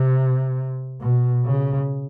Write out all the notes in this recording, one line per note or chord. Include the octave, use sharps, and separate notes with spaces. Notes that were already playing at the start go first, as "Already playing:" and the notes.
Already playing: C3
B2
C#3